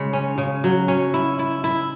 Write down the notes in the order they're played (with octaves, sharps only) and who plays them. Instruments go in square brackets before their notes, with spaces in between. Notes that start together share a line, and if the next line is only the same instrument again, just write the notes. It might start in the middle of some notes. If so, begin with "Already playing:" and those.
Already playing: [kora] C#3 G#3
C#4
C#3
F#3
C#4
E4
E4
E4